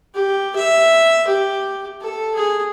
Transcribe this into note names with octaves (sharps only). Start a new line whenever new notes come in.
G4
E5
G4
A4
G#4